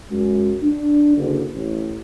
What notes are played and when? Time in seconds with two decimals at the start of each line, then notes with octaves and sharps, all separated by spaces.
0.11 F#2 G#3
0.63 D4
1.16 F#1 D3
1.54 A1